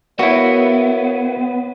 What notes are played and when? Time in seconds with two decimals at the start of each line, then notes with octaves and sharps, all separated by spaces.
0.19 B3 E4 F#4 A#4 C#5 E5 F5